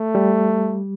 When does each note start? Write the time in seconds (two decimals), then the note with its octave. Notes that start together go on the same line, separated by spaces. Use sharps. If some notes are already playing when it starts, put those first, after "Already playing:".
Already playing: A3
0.15 G3